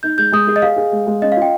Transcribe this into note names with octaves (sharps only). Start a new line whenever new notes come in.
D#4 G6
G#3 G6
G#3 D#6
G#4
D#5
G#4 F5
G#4
G#3
G#3
C#4 D#5
F5
F4 G5